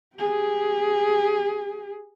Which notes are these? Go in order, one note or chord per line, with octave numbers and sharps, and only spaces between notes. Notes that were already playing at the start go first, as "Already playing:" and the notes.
G4 G#4